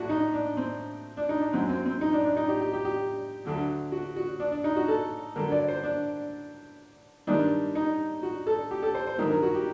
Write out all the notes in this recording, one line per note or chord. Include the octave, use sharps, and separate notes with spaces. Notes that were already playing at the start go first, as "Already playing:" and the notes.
Already playing: A2 F#3 D4 F#4
D#4
D4
C4
D4
D#4
D4
F#2 F#3 C4
C4
C4
D#4
D4
D4
D#4
G4
G4
G4
G4
D2 D3 F#3
F#4
F#4
D4
D4
D#4
F#4
A4
G2 D3 F#3 A#4
D5
C5
D4
G2 D#3 G3 D4
D#4
F#4
A4
G4
A4
C5
C5
G2 D#3 F#3 A#4
A#4
F#4
G4